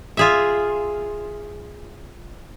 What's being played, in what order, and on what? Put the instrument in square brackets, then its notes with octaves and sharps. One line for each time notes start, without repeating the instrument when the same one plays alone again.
[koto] F4 G#4 E5